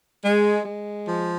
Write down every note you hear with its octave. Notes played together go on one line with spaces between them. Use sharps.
G#3
G#3
F3